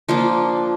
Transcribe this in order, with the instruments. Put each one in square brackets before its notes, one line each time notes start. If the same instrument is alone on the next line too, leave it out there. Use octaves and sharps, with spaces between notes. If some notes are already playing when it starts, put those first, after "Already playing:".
[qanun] F3 A#3 D4 F4